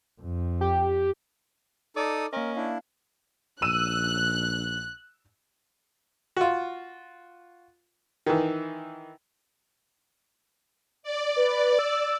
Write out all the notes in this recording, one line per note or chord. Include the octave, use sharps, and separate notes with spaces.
F2
G4
D#4 A4 D5 D6 D#6
A#3 C#4 A#4 D#5
D4 E4 F5
A#1 E6 F#6 D#7 E7
F4 F#4
D#3 E3
D5
B4
E6